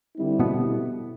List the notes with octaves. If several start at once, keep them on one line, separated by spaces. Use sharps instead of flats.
D3 G3 C4 E4
B2 B3